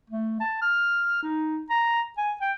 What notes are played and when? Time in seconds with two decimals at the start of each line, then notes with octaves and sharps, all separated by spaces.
0.10 A3
0.40 A5
0.62 F6
1.22 D#4
1.70 A#5
2.17 G#5
2.41 G5